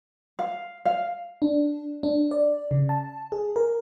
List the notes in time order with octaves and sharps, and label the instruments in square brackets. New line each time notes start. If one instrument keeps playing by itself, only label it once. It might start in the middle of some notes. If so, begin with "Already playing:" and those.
[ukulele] F5
F5
[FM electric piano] D4
D4
D5
C#3
A5
G#4
A#4